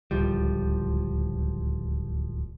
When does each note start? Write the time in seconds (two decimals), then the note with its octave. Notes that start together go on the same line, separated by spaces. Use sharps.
0.11 D1 C#2 F3 G3